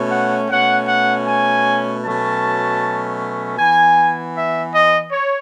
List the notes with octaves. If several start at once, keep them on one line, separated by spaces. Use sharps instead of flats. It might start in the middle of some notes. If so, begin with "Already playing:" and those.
Already playing: B2 A3 C#4
F#5
B2 A3 C#4 F#5
F#5
G#5
B2 F#3 A3 C#4 A5
E3 B3 G#5
E5
D#5
C#5